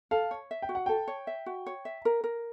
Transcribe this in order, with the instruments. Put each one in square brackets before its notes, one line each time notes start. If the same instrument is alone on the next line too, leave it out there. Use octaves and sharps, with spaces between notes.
[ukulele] A4 [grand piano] F5
[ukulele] C#5
E5
[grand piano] G5
[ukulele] F#4
[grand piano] F#5
[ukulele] A4 [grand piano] G5
[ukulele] C#5
E5
F#4
C#5
E5
A#4
A#4